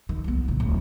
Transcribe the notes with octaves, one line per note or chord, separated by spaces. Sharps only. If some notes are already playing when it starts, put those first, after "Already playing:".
D#3
C2 B3
A#2 D3
D1